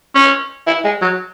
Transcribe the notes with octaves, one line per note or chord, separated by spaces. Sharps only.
C#4
E4
G#3
F#3